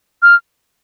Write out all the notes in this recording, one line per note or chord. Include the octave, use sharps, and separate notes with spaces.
F6